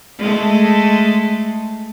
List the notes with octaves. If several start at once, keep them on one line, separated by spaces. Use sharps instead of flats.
G#3 A3